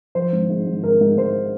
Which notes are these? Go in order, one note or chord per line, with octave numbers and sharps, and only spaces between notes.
F3 C5
G#1
G#2
G#1
G#1 A#4
G#2
G#2 C5